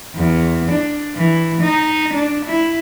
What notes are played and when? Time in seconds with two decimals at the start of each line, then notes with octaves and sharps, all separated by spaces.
0.16 E2
0.71 D4
1.16 E3
1.62 D#4
2.14 D4
2.46 E4